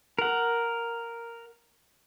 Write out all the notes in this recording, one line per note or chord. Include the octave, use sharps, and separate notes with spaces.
A#4 F#5